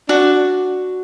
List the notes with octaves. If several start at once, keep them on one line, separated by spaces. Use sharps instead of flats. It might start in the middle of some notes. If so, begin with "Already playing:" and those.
D4 F#4